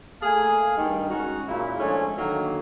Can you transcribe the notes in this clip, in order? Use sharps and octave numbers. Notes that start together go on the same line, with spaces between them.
A3 A#3 G#4 F5 G#5
G2 D#3 G3
G#3 C#4 D#4 F#4
A#2 C#3 E4
F3 G#3 A3 C#4 D4 C#5
D3 D#3 F#3 A#3